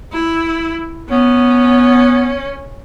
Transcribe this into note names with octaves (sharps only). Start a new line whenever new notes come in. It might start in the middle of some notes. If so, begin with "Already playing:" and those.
E4
B3 C#4